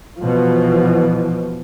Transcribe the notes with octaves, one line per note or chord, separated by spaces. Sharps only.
B2 E3 F3